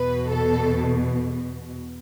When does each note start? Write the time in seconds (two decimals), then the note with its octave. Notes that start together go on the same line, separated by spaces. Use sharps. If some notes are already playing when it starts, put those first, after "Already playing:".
Already playing: E2 B2 B4
0.32 A4